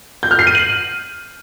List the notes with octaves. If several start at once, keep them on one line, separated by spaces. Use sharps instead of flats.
G6
F6
C7
D#7
F#7